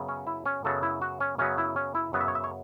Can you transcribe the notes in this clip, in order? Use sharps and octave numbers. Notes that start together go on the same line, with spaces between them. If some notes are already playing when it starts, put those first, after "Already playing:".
Already playing: F#2 C#3 F#3 B3
C#4
E4
C#4
F#2 C#3 F#3 B3 A4
E4
F#4
C#4
F#2 C#3 F#3 B3 C#4
E4
C#4
E4
F#2 C#3 F#3 B3 F#5
E5
C#5
E5
C#5